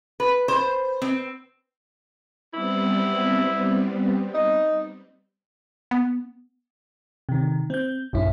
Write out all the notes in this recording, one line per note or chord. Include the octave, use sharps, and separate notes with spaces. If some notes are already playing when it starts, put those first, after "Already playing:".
B4
C5
C4
G3 B3 C4 E4
D#4
B3
C3 D#3
C4 G6
A#1 F#2 E4